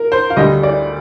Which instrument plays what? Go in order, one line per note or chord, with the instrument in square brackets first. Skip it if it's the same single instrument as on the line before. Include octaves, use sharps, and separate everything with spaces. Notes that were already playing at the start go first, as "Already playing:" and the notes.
Already playing: [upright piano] A#4
C5
F5
D2 D3 G3 D#5
D5